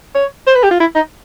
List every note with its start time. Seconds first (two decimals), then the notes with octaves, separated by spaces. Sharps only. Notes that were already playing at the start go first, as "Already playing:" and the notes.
0.15 C#5
0.47 C5
0.55 B4
0.63 G4
0.71 F4
0.80 E4
0.95 D#4